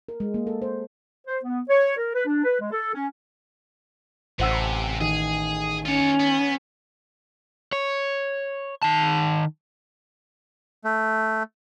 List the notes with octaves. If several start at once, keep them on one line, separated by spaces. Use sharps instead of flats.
A#4
G#3
A#3
A4
C5
C5
B3
C#5
A#4
B4
D4
B4
G#3
A4
C#4
A1 C3 C5 F#5 E6
D#3 G#4
C#4 F4 C#5
B3
C#5
D#3 A5
A3